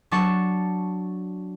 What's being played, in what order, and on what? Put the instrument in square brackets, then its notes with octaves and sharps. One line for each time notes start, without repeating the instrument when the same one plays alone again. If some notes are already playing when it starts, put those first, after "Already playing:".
[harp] F#3 D4 A5 C#6